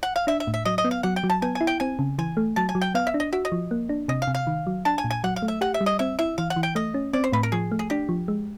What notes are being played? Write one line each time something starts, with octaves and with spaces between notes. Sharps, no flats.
F#5
F5
D4 E5
E5
A2
E5
F#3 D#5
D#5
B3
F5
F#3 F#5
G5
F#3
A5
B3 G#5
G#5
E4
G5
C4 G#5
C#3
E3 G#5
A3
F#3 A5
G#5
F#3
G5
B3 F5
E5
D4
D#5
F#4 E5
D#5
F3
A#3
D4
C3 D#5
F5
C3
F5
D#3
F#3
D4 A5
G#5
A#2
G#5
F#3 F#5
F5
A3
E5
G4 F#5
E5
G3
D#5
C4 E5
E4 E5
E3 F5
F#5
E3
G5
A3 D#5
C#4
C4 D5
C5
A2 B4
A#4
F3 G#4
A3
G#4
D4 G4
F3
G#3